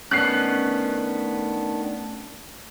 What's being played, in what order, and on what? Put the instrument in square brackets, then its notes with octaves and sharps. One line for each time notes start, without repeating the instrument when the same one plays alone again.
[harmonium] D#3 D4 [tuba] A3 [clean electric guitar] B3 C#4 [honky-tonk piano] F#6 C7